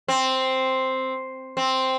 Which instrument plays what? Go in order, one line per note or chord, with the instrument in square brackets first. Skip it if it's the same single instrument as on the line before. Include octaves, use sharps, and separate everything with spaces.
[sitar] C4
C4